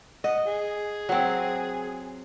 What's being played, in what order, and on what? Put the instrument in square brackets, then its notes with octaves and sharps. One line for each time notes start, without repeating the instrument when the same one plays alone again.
[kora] D#5 [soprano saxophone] F#5
[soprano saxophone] G#4
[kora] F#3 C4